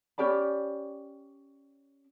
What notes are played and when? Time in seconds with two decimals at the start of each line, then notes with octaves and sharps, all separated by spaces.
0.18 C#4 G4 D5 B5